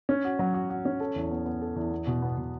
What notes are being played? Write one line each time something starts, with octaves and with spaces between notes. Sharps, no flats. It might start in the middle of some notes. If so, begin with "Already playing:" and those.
C#4
F#4
F#3
F#4
F#4
C#4
A4
E2
B3
B3
A4
E2
B3
B2
B3
B2